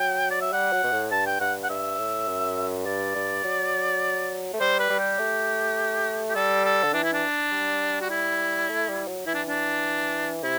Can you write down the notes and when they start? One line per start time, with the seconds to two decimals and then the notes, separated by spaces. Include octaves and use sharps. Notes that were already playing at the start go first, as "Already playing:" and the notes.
Already playing: F#3 G5
0.30 D5
0.41 E5
0.53 G3 F#5
0.73 F#3
0.84 B2
0.92 A2
1.11 G2 A5
1.26 G5
1.40 G2 F#5
1.64 F#5
1.69 G2 E5
1.99 A2
2.28 F#2
2.86 G2 D5
3.16 G2
3.45 F#3
4.53 A3
4.60 G3 C5
4.80 B4
4.90 G3
4.99 G4
5.19 A3
6.29 G4
6.35 G3 A4
6.64 A4
6.83 D3
6.93 E3 D4
7.04 E4
7.13 D4
7.52 G3
8.01 F#4
8.10 E4
8.69 A3
8.88 G3
9.08 F#3
9.27 E3 E4
9.34 D4
9.48 D4
10.43 C3 E4